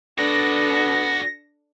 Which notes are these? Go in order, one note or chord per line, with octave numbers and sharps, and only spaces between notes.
B3 D4 F#4 A4 D5 A#6